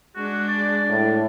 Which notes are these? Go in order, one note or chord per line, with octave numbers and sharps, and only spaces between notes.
G#3 D4 F#4
D5
A2